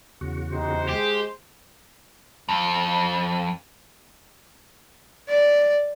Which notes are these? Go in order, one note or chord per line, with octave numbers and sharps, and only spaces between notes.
E2 C#3 F#4
C3 D#4 C5
G#3 G4
F2
D5